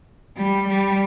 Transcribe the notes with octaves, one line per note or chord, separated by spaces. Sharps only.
G3
G3